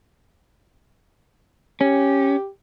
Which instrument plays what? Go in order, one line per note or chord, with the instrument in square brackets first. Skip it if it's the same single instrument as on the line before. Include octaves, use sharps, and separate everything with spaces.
[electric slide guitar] C#4 [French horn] G4